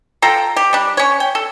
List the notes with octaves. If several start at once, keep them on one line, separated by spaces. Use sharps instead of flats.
F4 A4 G5 A#5
G4
G3 D4
C#4 C#5
G5
A4